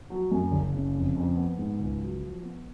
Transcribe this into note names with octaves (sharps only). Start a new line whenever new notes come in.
F#3
F#2
F#1
C#3
F2
F2
B3
G#2
C#2
F#3
F3
B3